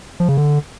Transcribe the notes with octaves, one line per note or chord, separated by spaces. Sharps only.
F3
C#3
D3